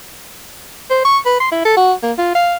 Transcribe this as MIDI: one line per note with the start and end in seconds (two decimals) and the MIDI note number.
0.90 1.03 72
1.05 1.18 85
1.26 1.38 71
1.40 1.47 84
1.52 1.63 64
1.65 1.73 69
1.77 1.93 66
2.03 2.12 58
2.18 2.33 65
2.35 2.57 77